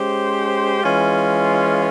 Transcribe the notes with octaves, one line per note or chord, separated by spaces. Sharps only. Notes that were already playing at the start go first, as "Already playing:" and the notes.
Already playing: G#3 C#4 G4 C5
E3 G#3 C#4 F4